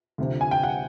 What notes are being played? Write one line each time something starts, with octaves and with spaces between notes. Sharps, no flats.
D2 C3 F3
G#5
G5
F#5